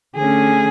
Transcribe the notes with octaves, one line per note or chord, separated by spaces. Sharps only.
D3 A3 C#4 G#4